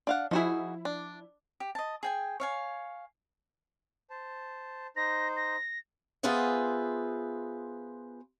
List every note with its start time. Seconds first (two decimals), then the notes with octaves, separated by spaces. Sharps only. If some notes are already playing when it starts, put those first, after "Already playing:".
0.07 D4 F5 F#5
0.31 F3 D#4 E4 F#4 G#4
0.85 D4
1.60 G4
1.75 D#5 A5
2.03 G#4 G5 G#5
2.40 C#5 F5 G#5
4.10 C5 A5
4.96 D#4 C5 A#6
5.36 A#6
6.23 B3 F4 G#4 B4 C5 E5